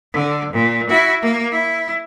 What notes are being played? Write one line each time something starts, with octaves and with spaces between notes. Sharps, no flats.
D3
A#2
E4 F#4
A#3
E4